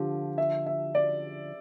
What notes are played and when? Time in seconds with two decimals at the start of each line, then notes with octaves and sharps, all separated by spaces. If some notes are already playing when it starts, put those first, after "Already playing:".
Already playing: D3 F3 F4 G4
0.38 E5
0.67 E5
0.95 D5